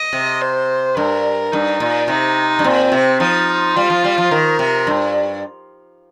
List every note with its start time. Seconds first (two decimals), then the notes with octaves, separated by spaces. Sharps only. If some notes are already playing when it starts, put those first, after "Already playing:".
Already playing: D#5
0.13 C3
0.42 C5
0.97 G2 A#4
1.52 G2 D#4
1.80 A#2
2.08 C3 D#4
2.59 G2
2.65 A#2 C4
2.92 C3
3.20 F3 D#4
3.76 G3 F4
3.90 F3
4.04 G3
4.18 F3
4.31 D#3 A#4
4.59 C3
4.87 G2